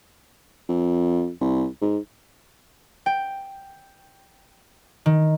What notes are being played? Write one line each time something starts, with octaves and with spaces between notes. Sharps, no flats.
F2
C2
G#2
G5
D#3